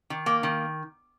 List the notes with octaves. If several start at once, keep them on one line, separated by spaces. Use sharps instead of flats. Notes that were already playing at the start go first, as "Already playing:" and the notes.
D#3
A#3
D#3